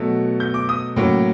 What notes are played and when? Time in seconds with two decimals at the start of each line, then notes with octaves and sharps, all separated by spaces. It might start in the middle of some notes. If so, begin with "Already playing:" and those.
Already playing: B2 F#3 A3
0.40 G6
0.54 D6
0.69 D#6
0.96 A2 F#3 A#3 C#4